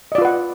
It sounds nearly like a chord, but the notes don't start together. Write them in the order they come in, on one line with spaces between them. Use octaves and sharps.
D#5 D5 F4 B4 F#5